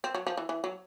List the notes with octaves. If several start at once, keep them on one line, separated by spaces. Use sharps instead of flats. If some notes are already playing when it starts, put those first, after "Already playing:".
C4
F#3
F3
E3
E3
F#3